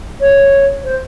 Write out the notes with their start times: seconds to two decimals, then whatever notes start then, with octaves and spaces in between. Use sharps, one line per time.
0.20 C#5
0.84 C5